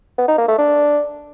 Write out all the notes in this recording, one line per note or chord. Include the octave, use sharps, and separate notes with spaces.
B3
D#4
A#3
A3
D4